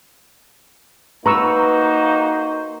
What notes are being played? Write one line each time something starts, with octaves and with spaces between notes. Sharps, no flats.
A#3 D#4 F#4 B4 C5 A#5 C#6 E6